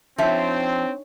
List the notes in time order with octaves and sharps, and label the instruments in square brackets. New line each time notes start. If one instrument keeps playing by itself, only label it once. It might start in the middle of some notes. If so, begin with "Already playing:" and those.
[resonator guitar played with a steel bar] F3 E5 [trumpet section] C4 [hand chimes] D4 D#4 C#5